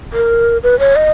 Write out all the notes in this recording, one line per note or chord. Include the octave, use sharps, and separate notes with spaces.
A#4
B4
C#5
D#5